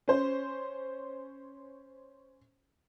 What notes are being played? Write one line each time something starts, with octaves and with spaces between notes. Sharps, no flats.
C#4 C5